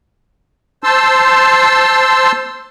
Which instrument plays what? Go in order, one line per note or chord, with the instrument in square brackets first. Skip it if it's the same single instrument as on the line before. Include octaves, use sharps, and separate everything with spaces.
[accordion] C5 A5 C6 E6